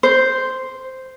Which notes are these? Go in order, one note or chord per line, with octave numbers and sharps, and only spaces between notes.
C5